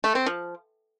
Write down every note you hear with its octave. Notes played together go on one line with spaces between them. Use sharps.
A3
C4
F3